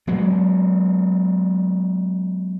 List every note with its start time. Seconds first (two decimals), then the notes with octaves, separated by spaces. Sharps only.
0.07 F#3 G#3 B3